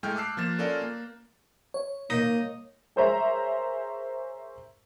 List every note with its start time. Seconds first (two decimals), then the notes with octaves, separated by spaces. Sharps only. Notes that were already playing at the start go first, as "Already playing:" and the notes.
0.03 A2 G#3 A3 G5 F6 G6
0.15 A5 D6 E6 F#6 C7
0.37 F3 A#3 A6 E7
0.59 C#4 F4 A4 A#4 D5 F5
0.82 A#3
1.74 C#5
2.10 A#3 D#4
2.96 G#4 A#4 C5 C#5 E5 A#5